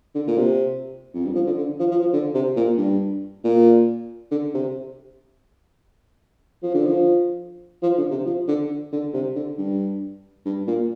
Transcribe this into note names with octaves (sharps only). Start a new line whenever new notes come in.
D3
A#2
C3
F2
G2
F3
D3
D3
F3
F3
F3
D3
C3
A#2
G2
A#2
D3
C3
F3
D3
F3
F3
D3
C3
F3
D3
D3
C3
D3
G2
G2
A#2